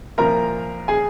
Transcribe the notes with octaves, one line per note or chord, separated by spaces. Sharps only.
C2 A#2 F3 A#4 A#5
G#4 G#5